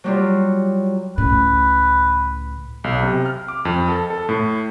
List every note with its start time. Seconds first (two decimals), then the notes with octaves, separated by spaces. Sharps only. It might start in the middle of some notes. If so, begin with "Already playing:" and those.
0.04 F#3 G3 F4
1.18 C#2 A2 B4
2.84 B1
3.03 C3
3.26 F6
3.48 D6
3.65 F2
3.89 A4
4.10 A4
4.29 A2